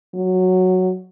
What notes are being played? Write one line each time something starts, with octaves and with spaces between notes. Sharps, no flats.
F#3